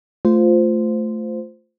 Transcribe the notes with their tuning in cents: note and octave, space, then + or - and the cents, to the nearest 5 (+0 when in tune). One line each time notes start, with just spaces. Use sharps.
A3 +0 F4 +0 C5 -15